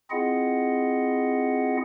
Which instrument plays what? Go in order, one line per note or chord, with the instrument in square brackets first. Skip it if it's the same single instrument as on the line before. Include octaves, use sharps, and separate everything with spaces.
[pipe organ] C4 E4 F4 G#4 D#5 F#5